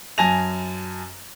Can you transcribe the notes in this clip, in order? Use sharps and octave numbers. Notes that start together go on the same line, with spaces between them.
F#2 G#5 A5 A#6 F7